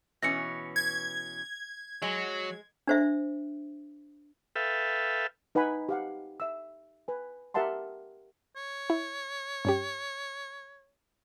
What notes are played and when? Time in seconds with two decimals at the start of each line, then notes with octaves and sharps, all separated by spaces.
0.23 B2 E3 C#4 A#6 C#7
0.76 G#6
2.02 F#3 G#3
2.87 D4 C5 E5
4.56 A4 B4 E5 F5 G5
5.55 D#4 B4 F#5 G#5 B5
5.89 G4 F5 F#5
6.40 E5 E6
7.08 B4 G#5
7.54 G4 A#4 E5 F#5 A5 C6
8.56 C#5
8.90 E4
9.65 G2 C#4 G4